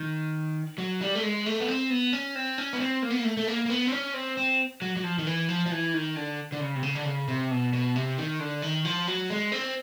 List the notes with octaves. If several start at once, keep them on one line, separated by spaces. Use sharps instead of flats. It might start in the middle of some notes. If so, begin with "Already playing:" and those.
Already playing: D#3
F#3
G3
A3
G#3
A3
B3
C4
B3
C#4
C4
C#4
B3
C4
A#3
B3
A#3
A3
A3
A#3
A#3
B3
C4
C#4
C4
C4
F#3
F#3
F3
D#3
E3
F3
F3
E3
D#3
D3
D3
C#3
C3
C#3
D3
C#3
C3
B2
B2
C3
D#3
D3
D#3
F3
F#3
G#3
C4